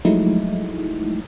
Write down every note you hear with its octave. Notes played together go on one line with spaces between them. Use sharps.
F3 F#3 G#3 A3 D#4 E4